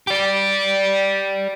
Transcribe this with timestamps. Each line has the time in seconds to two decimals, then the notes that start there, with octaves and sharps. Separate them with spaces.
0.07 G4 D5